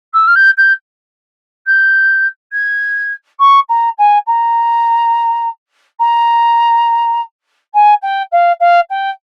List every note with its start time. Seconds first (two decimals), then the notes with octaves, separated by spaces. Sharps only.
0.13 E6
0.27 F6
0.35 G6
0.57 G6
1.66 G6
2.52 G#6
3.39 C#6
3.69 A#5
3.98 G#5
4.27 A#5
5.99 A#5
7.74 G#5
8.02 G5
8.32 F5
8.60 F5
8.90 G5